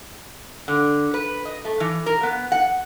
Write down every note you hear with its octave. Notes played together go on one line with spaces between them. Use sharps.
D3
B4
D#5
A3
E3
A#4
B3
F#5